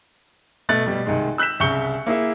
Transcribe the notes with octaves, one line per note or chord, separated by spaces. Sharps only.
B2 A3 F#6 A6
B2 G3
C2 D#3 G#3
E6 F#6 G6 B6 E7
C2 C#3 C#6 G6 C#7 G7
A#3 E4 G#4 E5